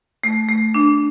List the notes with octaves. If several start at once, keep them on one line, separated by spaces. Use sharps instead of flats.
A3
A3
D4